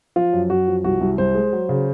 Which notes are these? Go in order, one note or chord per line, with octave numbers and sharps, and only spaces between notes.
F3 F4
F#2
F#2 F#4
F3
C2 F#4
C2
C2 C5
G#3
F#3
C#3